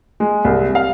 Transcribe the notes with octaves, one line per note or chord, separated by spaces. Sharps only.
G#3
C2
F5